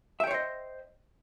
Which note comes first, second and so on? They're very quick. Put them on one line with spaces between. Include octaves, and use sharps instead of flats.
E5 G5 C#5 C5 D#5